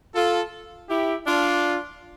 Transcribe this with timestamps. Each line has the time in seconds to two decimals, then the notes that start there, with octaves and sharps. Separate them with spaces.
0.15 F4 A4
0.89 E4 G4
1.25 D4 F4